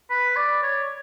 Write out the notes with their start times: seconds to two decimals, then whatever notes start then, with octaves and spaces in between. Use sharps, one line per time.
0.11 B4
0.37 D5
0.63 C#5